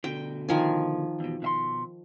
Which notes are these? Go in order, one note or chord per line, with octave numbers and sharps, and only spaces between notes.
D2 B2 D3 G5
D#3 F3 G#5
E2 B2
B2 E5 C6